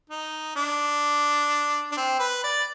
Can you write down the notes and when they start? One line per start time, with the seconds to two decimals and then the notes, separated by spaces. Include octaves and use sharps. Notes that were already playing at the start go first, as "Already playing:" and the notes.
0.10 D#4
0.56 D4
1.92 D4
1.97 C4
2.20 B4
2.44 D5